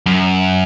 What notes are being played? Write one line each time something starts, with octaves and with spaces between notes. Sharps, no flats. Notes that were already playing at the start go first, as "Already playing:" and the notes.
F#2